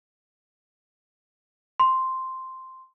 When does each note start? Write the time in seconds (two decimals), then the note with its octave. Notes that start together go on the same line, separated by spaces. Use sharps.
1.80 C6